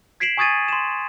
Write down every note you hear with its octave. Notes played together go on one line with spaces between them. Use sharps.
G#6 B6 C7 D7 E7 F#7
G#5 C#6 D#6 G#6 A6 D#7
C6 E7